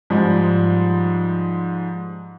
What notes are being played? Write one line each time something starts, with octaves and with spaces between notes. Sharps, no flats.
G#2 F3 G3 G#3